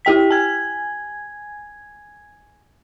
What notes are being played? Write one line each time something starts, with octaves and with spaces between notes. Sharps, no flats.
E4 G4 G5 B6
G#5 G#6